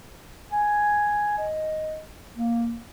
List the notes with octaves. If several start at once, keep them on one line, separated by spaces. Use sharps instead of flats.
G#5
D#5
A#3